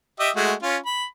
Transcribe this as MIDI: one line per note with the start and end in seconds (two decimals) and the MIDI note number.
0.20 0.30 67
0.20 0.30 75
0.20 0.30 76
0.36 0.53 56
0.36 0.53 57
0.36 0.53 66
0.63 0.77 61
0.63 0.77 65
0.86 1.05 83